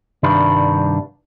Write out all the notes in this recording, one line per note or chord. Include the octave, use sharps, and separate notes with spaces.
C2 G2 D#3 G3 D4 B4